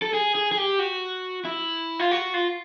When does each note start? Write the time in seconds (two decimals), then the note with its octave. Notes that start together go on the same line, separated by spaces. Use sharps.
0.02 A4
0.14 G#4
0.35 G#4
0.52 G#4
0.58 G4
0.79 F#4
1.45 E4
1.99 F4
2.11 F#4
2.34 F4